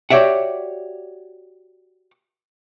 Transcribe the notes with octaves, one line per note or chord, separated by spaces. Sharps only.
F#4 G4 C#5 D5 E5 F#5